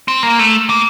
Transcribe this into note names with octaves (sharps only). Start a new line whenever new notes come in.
C4
A#3
A3
A#3